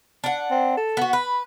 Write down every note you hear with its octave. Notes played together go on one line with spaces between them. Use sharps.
D4 F#5
C4
A4
B3 F#4
B4 B5